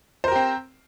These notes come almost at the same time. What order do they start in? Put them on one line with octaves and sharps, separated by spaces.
C5 A#4 G4 C4